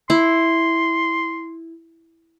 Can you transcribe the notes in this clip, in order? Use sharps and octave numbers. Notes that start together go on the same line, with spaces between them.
E4 C6